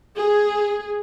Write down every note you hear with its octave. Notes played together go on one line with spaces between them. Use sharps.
G#4